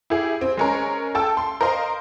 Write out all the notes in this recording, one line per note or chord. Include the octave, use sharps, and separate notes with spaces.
E4 G4 G#4
C4
G#3 C#4 A#4
A4 G5 A5 E6
C6
A#4 C5 D#5 F5 C6